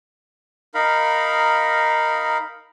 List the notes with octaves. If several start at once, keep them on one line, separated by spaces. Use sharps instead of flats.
D#4 A#4 F5 B5